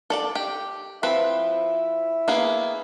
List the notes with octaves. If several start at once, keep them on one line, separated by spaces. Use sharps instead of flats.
A4 D5 A5
G4
F3 C4 E4 B4
A#3 B3 G#4